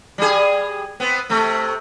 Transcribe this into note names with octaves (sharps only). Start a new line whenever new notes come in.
G3 G#4
B3 C4
C3 A3